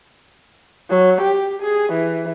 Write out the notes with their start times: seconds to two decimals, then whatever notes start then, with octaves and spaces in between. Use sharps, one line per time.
0.90 F#3
1.21 G4
1.62 G#4
1.93 E3